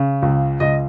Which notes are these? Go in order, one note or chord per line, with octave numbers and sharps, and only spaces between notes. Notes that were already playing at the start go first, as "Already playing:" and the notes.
Already playing: C#3
C#2
C#2 D#5